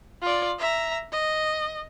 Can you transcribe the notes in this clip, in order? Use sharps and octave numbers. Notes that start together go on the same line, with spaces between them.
F4 D5
E5 A#5
D#5